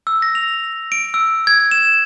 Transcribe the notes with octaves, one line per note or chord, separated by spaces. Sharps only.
E6
A#6
F7
D7
E6
G#6
E7